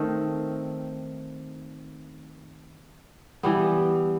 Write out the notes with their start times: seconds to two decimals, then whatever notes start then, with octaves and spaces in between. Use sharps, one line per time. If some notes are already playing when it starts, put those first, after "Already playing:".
Already playing: D#3 A3 C4
3.43 E3 G3 B3